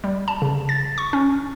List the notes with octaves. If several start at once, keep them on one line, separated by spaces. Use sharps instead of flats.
G3
A5
C#3
A6
C#6
C#4